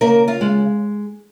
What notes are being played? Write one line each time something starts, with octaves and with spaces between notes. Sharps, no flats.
C#3 A#3 A#4
F4 F5
G#3